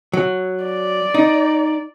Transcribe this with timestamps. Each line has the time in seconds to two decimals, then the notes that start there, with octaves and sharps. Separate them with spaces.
0.13 F#3
0.65 D5
1.14 D#4